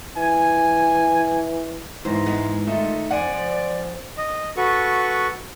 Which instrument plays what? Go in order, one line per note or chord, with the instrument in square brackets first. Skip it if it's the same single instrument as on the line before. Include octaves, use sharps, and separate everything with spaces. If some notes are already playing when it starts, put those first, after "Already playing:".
[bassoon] E3 [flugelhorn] G#5
[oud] D#2 C5 [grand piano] G#2 E3 [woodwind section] E5 A#5 C6
[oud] G#3 B3
[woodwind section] D#3 F4 [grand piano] A3 D#4 E5
[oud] F2 D4 [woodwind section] D5 [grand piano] F#5 G#5 D#7
[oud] F3
[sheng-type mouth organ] D#5
F#4 A4 B4 C#6